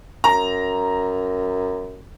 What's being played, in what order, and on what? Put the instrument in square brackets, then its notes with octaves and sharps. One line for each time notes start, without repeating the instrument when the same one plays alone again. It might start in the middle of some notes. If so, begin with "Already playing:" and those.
[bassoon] F#2 [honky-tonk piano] A#5